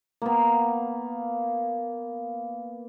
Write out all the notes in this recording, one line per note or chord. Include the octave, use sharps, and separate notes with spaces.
A#3 B3